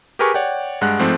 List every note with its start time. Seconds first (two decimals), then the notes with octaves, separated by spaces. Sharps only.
0.19 G4 G#4 A#4 B4 G#5 C#6
0.34 C#5 D5 F#5 G5
0.81 G2 G#3 F#5 F#6
0.99 G#2 F3 A3 C4